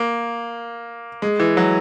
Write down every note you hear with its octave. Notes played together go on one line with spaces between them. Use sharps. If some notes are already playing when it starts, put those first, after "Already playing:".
Already playing: A#3
G#3
E3
F#3